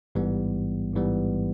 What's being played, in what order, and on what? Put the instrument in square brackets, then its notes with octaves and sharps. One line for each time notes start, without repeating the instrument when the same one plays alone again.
[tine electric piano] A1 G#2 E3 G3 B3
A1 G#2 E3 G3 B3